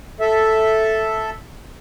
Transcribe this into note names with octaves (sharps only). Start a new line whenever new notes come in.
A4 E5